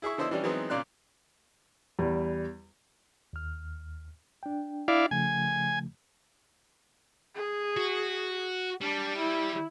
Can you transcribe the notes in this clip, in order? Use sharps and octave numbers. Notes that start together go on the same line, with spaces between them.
E4 G#4 E5 C#6
D3 B3 E4 C5 D#5 E6
E3 G3 C#4 D4
E3 F#3 G#3 B3 C4 D#4
A#2 C#3 A#3 D5 C6 F#6
E2 G3
D#2 F6
D4 G5
E4 D5 F5
C#3 F3 A3 G#5
G#4
F#4
G3 D4
E4